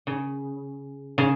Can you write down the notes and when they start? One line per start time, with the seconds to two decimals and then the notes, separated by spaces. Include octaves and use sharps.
0.07 C#3
1.18 C#3